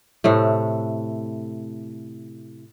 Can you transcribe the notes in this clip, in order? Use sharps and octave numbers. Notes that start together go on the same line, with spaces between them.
A2 C3 A3